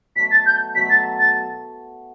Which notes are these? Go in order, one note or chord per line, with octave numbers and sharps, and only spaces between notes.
B2 F#3 A3 B6
A6
G6
B2 F#3 A3 B6
A6
A6